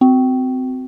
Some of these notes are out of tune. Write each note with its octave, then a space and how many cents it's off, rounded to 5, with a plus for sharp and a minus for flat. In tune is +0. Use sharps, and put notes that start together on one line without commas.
C4 -25 F#4 +0